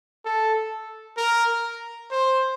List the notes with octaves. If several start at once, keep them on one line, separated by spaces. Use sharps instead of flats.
A4
A#4
C5